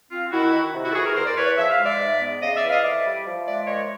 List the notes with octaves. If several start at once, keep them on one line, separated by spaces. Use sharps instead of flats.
C4 F4
D#3 E4 F#4
D#3
C3
E4 F#4
A4
E3 F#4 G#4
G#4 A#4
E2 A#4 C5
D5
E2 B4 C#5
F3 E5
F5
G#3
D5 E5
G#2
B3
C#3 D#5 F5
D5 E5
E3
D#5 F5
F2 D5 E5
G3
F3
G#3 D5 E5
A#2 C#5 D#5